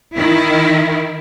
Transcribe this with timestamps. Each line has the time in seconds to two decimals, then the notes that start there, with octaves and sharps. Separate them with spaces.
0.15 D#3 E4